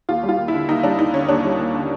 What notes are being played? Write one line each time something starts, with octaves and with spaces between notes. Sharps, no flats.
D#2 F4
G3
F4
D#2
E4
D3
D#2 D#4
G3 D4
D#2 D#4
D3 C#4
D#2 D4
G3
D#2
D3